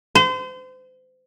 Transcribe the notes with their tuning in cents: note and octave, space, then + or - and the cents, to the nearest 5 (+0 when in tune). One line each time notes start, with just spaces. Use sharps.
C5 -35